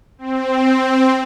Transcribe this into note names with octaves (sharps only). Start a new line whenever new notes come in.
C4